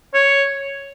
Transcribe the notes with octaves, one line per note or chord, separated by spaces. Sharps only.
C#5